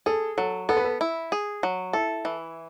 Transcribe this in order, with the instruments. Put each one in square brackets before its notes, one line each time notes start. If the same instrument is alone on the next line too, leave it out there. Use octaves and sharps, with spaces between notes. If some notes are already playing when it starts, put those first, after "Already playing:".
[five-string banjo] G#4 [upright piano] A4
[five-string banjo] F#3 [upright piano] A4
[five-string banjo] B3 [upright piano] A4
[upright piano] B4
A4
[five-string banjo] E4
G#4
F#3
[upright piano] E4 [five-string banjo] A4
[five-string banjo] E3